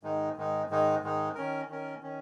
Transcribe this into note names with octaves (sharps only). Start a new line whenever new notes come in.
G#2 D#3 G#3 D#4
G#2 D#3 G#3 D#4
G#2 D#3 G#3 D#4
G#2 D#3 G#3 D#4
D#3 C#4 A#4
D#3 C#4 A#4
D#3 C#4